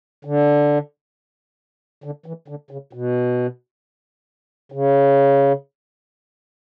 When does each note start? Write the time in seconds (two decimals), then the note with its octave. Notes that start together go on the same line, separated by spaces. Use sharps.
0.25 D3
2.04 D3
2.26 E3
2.48 D3
2.71 C#3
2.93 B2
4.72 C#3